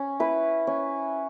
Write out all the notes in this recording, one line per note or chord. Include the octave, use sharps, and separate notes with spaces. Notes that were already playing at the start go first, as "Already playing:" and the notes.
Already playing: C#4
E4 B4
C#4